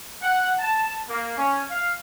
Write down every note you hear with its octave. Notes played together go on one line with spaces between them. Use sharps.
F#5
A5
A#3
C#4
F5